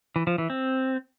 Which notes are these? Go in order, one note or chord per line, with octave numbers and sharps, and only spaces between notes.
E3
F3
E3
C4